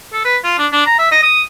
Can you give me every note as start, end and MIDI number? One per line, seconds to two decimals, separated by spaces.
0.13 0.21 69
0.25 0.37 71
0.44 0.56 65
0.58 0.67 62
0.73 0.83 62
0.86 0.95 82
0.99 1.11 76
1.12 1.22 75
1.23 1.42 87